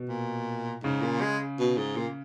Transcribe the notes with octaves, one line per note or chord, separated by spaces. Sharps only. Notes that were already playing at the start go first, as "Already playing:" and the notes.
Already playing: B2
A#2
G#2 C#3
A#2
G#3
B2
G#2
A#2